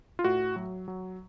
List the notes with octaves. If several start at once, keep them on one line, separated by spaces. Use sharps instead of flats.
F4
A2 F#4
F#3
F#3